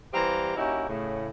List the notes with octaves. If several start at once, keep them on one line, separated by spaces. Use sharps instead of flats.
E3 G3 C4 G4 F5 A#5
A#3 C#4 D#4 E4 F#4 G4
A2 C#3